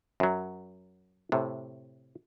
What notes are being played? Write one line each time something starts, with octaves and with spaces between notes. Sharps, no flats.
F#2 F#3
A2 C3